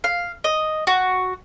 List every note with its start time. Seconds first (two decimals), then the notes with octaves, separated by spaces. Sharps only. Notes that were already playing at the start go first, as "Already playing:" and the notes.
0.04 F5
0.44 D#5
0.87 F#4